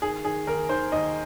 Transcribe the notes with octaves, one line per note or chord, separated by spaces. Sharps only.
D#3 G#4
D#3 G#4
D#2 A#4
D#3 C5
D#2 D#5